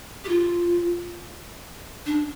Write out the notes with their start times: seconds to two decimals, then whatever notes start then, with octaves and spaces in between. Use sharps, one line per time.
0.24 G4
0.29 F4
2.06 D4